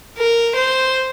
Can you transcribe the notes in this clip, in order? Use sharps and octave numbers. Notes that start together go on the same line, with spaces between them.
A#4
C5